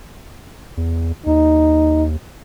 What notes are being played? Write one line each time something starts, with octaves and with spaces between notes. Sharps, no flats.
E2
D#2 D#4